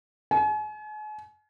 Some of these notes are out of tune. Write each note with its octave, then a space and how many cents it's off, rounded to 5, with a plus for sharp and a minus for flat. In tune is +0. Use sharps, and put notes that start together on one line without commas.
G#5 +40